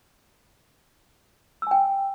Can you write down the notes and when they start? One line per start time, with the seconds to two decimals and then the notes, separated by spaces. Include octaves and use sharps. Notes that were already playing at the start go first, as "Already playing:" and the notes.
1.62 E6
1.67 G#5
1.71 G5